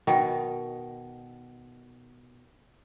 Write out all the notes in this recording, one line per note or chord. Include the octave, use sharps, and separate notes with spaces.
B2 D#3